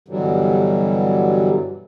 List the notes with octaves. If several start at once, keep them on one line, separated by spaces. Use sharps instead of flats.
G2 B2 D3 E3 F#3 G3